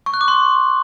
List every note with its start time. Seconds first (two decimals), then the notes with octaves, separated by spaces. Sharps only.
0.06 C#6
0.14 F#6
0.21 D6
0.28 C6